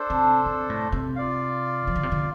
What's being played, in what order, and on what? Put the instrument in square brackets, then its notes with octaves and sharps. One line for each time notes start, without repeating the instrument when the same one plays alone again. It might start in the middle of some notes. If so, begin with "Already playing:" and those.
Already playing: [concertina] D4 A4 C5
[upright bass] C3
C3
A2
C3
[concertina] F4 D5 F5
[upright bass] F3
D3
C3
D3